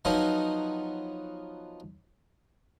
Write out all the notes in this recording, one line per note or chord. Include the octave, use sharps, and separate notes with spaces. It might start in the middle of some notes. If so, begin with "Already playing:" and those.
F3 F#3 B3 D#4 F4 F#5